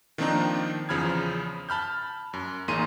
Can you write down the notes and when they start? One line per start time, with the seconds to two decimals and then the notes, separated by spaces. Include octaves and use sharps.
0.18 D#3 F3 A#3 C4 D4 D#4
0.89 E2 C#3 F3 B5 F6 G#6
1.69 A5 B5 F6 G6
2.33 F#2
2.68 A1 A#3 D#4 G#4 C6 D#7